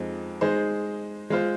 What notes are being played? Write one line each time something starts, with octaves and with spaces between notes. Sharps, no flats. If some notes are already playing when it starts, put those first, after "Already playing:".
Already playing: F2 F3 G#3 C4 D#4
G#3 D#4 G#4 C5
G#3 F4 C5